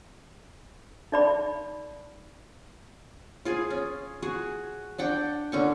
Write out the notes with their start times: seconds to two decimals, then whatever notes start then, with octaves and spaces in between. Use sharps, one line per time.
1.12 D#4 D5 B5
3.45 F4 G#4
3.70 C#4
4.22 F#4 G#4
4.98 D4 F#5 G5
5.52 D3 C#4 C#6